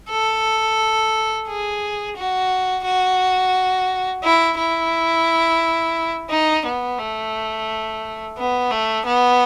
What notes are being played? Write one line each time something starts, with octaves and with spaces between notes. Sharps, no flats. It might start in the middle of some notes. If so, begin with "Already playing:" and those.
A4
G#4
F#4
F#4
E4
E4
D#4
B3
A3
B3
A3
B3